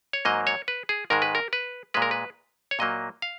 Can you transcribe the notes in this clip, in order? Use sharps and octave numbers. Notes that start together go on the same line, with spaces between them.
C#5
G#2 F#3 A#3 D#5
C#5
B4
G#4
G#2 D#3 G#3 A#4
B4
A#4
B4
A#2 G#3 B4
A#4
B4
C#5
A#2 F#3 A#3 D#5
F5